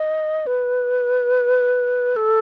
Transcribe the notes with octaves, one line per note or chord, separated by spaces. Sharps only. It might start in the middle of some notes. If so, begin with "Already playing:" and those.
Already playing: D#5
B4
A4